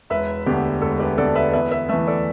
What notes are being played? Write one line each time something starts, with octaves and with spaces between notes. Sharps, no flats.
E1 B4 E5
D2 D3 B3 G4
E1 A4
G4 B4
D2 D3 B3 A4 D5
B4 E5
E2 B4 E5
B4 E5
E3 A3 B4 E5
A4 D5